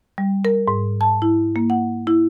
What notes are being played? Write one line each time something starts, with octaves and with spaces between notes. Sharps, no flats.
G3
A#4
G#2
A5
E4
A#3
F#5
E4